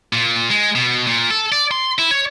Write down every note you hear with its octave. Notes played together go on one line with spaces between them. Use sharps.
A#2
G#3
B2
A#2
A4
D5
C6
E4
C#5